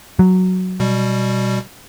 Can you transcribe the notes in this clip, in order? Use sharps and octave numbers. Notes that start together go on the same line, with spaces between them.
F#3
B2 G3